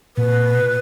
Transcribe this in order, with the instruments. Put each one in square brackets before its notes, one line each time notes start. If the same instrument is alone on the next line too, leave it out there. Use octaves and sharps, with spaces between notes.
[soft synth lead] A#2 [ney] B4
[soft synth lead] B2
A#2